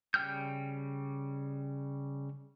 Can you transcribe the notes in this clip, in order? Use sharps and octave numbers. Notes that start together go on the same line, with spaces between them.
C#3 G3 G5 F6 G6